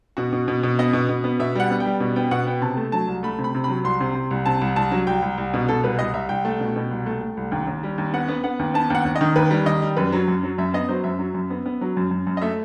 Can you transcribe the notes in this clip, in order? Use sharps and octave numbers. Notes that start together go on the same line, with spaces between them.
B2 F#4
B2
B2
B2
B3 D#5
B2
B2
B3
B2 E5
G3 F#5
B3
G5
G3
B2
B3 G5
B2 F#5
B3 G5
C3 A5
A3
F#3 A5
C2
A3 B5
C3
B5
C3
F#3 B5
C2 C6
C3
C3
C2
C3 A5
C2
C2 A5
F#3
C2 G5
C2
C2
B2
B2 A4
C2 B4
C2 D#5
C2 E5
C2 G5
A3
B2
B2
C2
A3
A3
C2
D#2
D#2
G3
D#2
B3 F#5
B3
B3 F#5
D#2
B3 A5
D#2 F#5
D#2
D#5
D#3
D#2 B4
G3
D#3 D#5
G3
F#2 B4
F#3
F#2
F#3
F#2 E5
B3 D#5
F#3 C5
F#2 E5
F#3
F#2
B3
B3
F#3
F#2
F#2
F#2
D#5
A3 E5